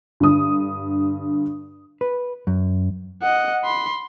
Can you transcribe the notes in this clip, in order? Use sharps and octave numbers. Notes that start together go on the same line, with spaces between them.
G2 D3 D#6
B4
F#2
D#5 F#5
B5 C6